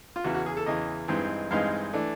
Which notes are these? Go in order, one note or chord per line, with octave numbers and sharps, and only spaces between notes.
F4
E2 C#3 E3 F#4
F#4
G#4
A4
E2 C#3 E3 D#5
G2 E3 G#3 C4 D#4
G2 E3 G#3 C4 D#4 F5
E3 A3 D4